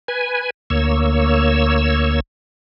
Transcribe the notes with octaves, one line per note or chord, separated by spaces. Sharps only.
B4 G#5
D2 A#3 C#5 E6